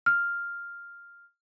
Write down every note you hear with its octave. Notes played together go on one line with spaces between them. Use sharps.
F6